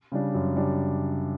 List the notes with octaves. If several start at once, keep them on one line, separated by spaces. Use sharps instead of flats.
C#3 G3 D4
F#2
C#3 G3 D4